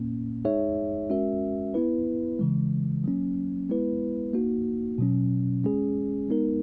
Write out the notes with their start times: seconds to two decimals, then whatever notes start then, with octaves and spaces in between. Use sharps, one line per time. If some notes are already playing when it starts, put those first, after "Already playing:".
Already playing: A#2 A#3 C#4
0.44 G#3 D#4 G#4 C#5 E5
1.10 G#3 C#4 F#4 A#4 E5
1.74 B3 E4 B4
2.39 C#3 E3 G#3
3.04 F#3 A#3 C#4
3.69 G#3 B3 E4 B4
4.33 A#3 D#4 F#4
4.98 B2 F#3 C#4
5.64 G#3 C#4 G#4
6.29 G#3 B3 D#4 A#4